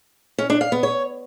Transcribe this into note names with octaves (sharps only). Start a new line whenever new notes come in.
C#4
D4
F5
B3
C#5